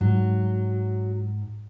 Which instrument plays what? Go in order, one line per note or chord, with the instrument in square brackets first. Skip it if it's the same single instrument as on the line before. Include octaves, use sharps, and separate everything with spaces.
[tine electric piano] G#2 [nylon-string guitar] F#3